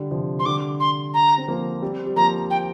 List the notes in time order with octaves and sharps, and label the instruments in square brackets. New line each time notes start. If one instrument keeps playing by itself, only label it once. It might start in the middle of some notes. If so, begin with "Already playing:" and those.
Already playing: [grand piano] D3 G3
C3 F3
[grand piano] F3 [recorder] C6
[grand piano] D3 G3 [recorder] D6
[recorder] C6
A#5
[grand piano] C4
F3 A#3
G3 C4
G3
[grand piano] F3 A#3 [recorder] A#5
[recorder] G5